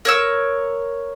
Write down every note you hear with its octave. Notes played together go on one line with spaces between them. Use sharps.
A#4 C#5 E6